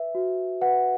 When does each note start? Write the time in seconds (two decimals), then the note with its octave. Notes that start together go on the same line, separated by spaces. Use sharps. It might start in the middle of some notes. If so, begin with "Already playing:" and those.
Already playing: B4 E5
0.15 F#4
0.61 B4 F#5